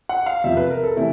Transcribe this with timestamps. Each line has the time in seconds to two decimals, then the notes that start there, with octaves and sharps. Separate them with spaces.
0.09 F#5
0.26 F5
0.44 F2 C3 F3 E5
0.57 B4
0.70 A#4
0.84 A4
0.96 C3 E3 A3 E4